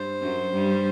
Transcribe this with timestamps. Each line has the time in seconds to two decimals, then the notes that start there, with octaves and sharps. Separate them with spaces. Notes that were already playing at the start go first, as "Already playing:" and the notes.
Already playing: G2 G3 C5
0.21 F#2 F#3
0.53 G2 G3